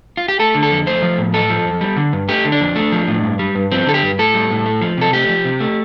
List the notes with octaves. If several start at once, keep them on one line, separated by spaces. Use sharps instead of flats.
F4
G4
A3 A4
D3
A4
F2
A3 C5
F3
A2
A3 A4
F3
F2
G3
D3
G2
A3 G4
D3
D4
F2
A3
F3
A2
G2
G3
G2
F3 C4
D3 A4
G4
G2
A2 A4
G3
A2
A3
F3
C3 A4
A3 G4
F3
C3
A3